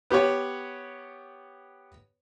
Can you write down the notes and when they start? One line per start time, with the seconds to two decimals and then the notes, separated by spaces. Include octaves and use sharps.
0.10 B3 G4 B4 C#5